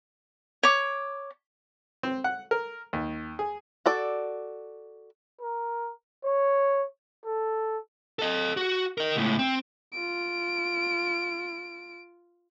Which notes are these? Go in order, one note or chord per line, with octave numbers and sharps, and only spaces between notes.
C#5 D6
C4
F#5
A#4
D#2
G#4
F#4 A4 D5
A#4
C#5
A4
A4 D#5
F#4
A#4 D#5
C#2 A2
C4
F4 D7